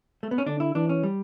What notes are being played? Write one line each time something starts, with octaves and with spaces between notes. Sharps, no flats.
A3
B3
C#4
D3 D4
E4
E3 D4
C#4
G3